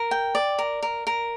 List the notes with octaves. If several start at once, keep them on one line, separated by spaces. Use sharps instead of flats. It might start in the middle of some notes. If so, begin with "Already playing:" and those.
Already playing: A#4
G5
D5
A#4
A#4
A#4